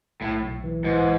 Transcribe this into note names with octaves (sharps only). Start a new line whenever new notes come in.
B1 A2
B1
E3
G#2 E3